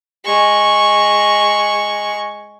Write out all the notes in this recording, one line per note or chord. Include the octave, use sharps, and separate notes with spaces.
G#3 C#6